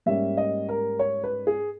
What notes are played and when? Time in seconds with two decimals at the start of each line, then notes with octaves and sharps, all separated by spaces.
0.06 G#2 G3 A#3 C#4 E5
0.37 D#5
0.69 A#4
0.99 C#5
1.24 B4
1.47 G#4